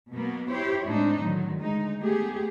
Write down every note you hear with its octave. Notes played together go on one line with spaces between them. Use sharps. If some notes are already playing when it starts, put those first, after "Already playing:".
B2 F#3 A#3 B3
E4 G4 C5 C#5
A2 G#3 C4 D4 D#4
A2 D3 D#3 F#3
D2 G#3 D#4
A3 B3 G4 G#4